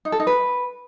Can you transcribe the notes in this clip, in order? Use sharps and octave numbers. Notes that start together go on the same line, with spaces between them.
D#4
A4
D#4
B4